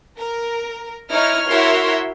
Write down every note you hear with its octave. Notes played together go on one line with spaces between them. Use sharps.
A#4
D#4 E4 C#5 F6
E4 F#4 A#4 C#5 E5 C6